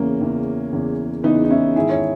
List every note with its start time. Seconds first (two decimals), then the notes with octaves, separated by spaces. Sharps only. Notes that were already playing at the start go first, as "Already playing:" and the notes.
Already playing: E2 C#3 E3 A#3 C#4
0.20 E2 C#3 E3
0.73 E2 C#3 E3
1.24 E2 C#3 E3 B3 D#4
1.44 D#4
1.50 C#4 E4
1.76 G#2 D#3 E4 G#4
1.90 C#5